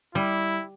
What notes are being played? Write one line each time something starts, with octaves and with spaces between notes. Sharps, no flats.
G3 E4